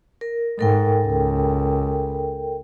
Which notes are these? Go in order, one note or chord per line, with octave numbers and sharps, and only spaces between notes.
A#4
G#2 A4 A#4 G5
C#2